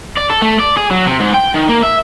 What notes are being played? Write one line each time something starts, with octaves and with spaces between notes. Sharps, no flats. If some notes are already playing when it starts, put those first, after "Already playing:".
D5
A4
A3
D5
G#4
F#3
C3
G#2
G5
D#3
A#3
E5